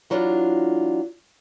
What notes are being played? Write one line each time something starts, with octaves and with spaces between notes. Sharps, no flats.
E3 F#3 D4 F4